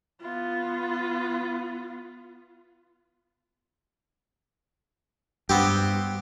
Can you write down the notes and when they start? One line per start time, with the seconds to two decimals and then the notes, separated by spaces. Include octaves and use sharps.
0.22 B3 F4
5.49 G2 B3 C4 G4